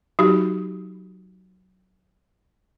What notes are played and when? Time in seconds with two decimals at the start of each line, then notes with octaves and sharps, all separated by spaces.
0.19 F#3 D#4 F#4 G4